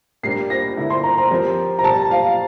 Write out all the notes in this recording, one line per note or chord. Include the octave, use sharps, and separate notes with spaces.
A#2 G3 A#3 D4 C7
A#6
D3 G3 A#3 E4 G4
C6
A#5
A#5
F3 C4 G4 A#4
A#5
A#2 G3 A#3 A5
F5